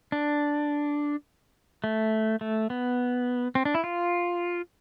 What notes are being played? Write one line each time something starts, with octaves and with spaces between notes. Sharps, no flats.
D4
A3
A3
B3
C4
D4
E4
F4